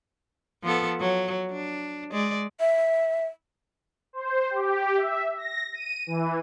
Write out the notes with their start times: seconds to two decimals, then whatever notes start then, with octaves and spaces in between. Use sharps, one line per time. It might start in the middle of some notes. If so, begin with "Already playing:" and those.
0.63 F3 B3 A4
1.00 F#3
1.52 D4
2.12 G#3 D5
2.60 E5
4.13 C5
4.51 G4
4.97 E5
5.37 A#6
5.75 D#7
6.07 E3